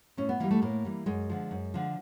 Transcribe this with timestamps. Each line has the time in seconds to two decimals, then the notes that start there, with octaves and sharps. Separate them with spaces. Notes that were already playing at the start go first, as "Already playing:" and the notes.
0.17 A2 C#4
0.29 B3
0.40 E3 G3 A#3
0.51 A3
0.62 A2 A#3
0.85 E3 G3
1.06 F#2 G#3
1.29 D3 F3
1.51 F#2
1.74 D3 F3